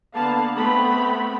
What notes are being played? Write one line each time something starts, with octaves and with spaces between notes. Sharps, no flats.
D3 A#3 B3 F5 A5
A3 B3 C4 B5